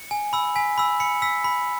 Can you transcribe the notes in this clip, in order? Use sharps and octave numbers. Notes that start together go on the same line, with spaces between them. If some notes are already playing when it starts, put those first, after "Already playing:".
Already playing: C#7
G#5
B5 E6
G#5 B6
B5 E6
B5 C#7
E6 B6
B5